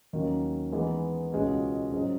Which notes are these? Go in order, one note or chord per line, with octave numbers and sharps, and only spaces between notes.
D#2 D#3 F#3 C#4
E3 G#3 B3 D#4
C#2 B2 G#3 C#4
G#2 F#3 C#4 G#4 D#5